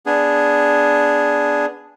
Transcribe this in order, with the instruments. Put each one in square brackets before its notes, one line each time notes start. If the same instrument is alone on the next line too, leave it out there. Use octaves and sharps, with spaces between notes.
[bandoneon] B3 D4 G#4